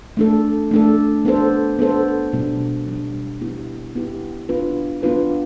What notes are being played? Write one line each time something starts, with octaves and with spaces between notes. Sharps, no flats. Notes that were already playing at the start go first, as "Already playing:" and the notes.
A3 D4 A4
A3 D4 A4
B3 D4 A4 C5
B3 D4 A4 C5
B2 G3 D4
B2 G3 D4
B3 E4 G4
B3 E4 G4
B3 D4 F4 B4
B3 D4 F4 B4